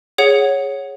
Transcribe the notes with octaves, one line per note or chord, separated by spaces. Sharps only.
G#4 C#5 F#5